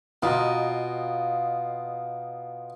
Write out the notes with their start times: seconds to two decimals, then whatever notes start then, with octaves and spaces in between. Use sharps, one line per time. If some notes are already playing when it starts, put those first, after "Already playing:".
0.23 B2 F4 D#5 A#5